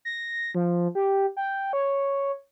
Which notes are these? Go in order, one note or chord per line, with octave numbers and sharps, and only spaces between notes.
A#6
F3
G4
G5
C#5